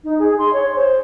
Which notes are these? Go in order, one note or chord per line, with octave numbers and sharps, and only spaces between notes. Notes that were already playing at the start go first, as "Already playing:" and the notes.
D#4
G#4
C6
C#5
C5